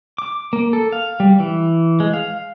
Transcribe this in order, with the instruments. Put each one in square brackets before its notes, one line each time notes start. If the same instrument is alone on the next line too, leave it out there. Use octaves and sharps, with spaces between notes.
[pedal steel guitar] D6
A#3
A4
F5
G3
E3
G#3
F5